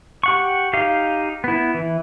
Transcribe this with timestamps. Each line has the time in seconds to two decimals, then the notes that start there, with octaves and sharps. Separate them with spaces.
0.23 G4 F#5 C#6
0.73 D#4 G4 F5
1.44 B3 E4
1.74 E3